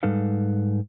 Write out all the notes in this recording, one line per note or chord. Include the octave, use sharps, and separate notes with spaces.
G#2 G3 D#4 A4 B4 F5